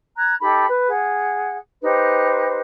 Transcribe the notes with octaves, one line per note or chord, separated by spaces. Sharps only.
A#5 F#6 G#6
D#4 G4 A4 B5
B4
G#4 F#5
D#4 G4 B4 C5